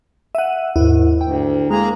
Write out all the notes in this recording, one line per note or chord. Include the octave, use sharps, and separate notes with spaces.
E5 F#5 D#7
D#2 G#2 E4
D2 G5
G#3 A#3 G#4 A#5